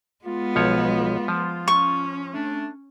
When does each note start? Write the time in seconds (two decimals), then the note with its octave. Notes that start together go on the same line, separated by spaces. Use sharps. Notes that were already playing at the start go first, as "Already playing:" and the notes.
0.25 G#3 B3 F4
0.56 B1 F3 C#5
1.28 F3
1.68 C#4 C#6
2.33 A3 D4